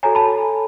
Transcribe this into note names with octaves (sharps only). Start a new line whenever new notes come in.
F#4 A4 C#5 G#5 A#5
A5 B5